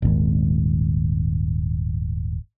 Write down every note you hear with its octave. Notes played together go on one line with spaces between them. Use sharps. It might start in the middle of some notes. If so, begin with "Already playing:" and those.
D#1 G#1